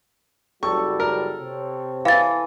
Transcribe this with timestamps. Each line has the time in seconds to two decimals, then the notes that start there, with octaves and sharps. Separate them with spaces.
0.63 F#1 G3 F#4 A4 C#6
1.00 A#4
1.40 C3 C4 C#5
2.05 E3 F5 A6